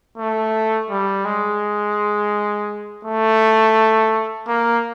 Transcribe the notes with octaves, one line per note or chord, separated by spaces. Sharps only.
A3
G3
G#3
A3
A#3